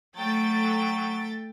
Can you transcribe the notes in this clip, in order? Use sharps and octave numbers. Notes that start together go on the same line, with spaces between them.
F#3 A3 G5 A6